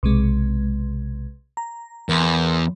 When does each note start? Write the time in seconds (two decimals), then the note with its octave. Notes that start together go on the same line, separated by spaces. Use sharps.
0.03 B1 C3 G#3
1.57 A#5
2.09 E2 A#4 B5 C6